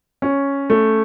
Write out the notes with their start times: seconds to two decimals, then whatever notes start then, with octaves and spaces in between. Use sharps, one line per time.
0.22 C#4
0.70 A3